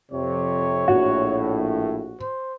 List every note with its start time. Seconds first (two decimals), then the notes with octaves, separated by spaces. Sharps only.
0.12 F2 C3 C#5
0.88 A#1 A2 F#4
2.21 C5